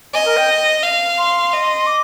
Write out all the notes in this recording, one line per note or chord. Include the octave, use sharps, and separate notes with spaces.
D#5 G#5
A#4
G5
F5
C6
D#5
D6